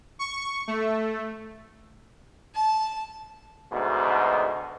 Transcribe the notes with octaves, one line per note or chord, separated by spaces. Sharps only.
C#6
A3
A5
D2 G#2 B2